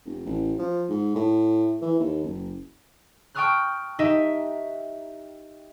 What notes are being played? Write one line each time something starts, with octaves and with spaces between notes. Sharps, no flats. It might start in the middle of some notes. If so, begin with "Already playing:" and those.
F1
A1
F3
G#2
A2
E3
D#2
F#1
G5 A5 C#6 D#6 F6 F#6
D#4 G4 D#5 E5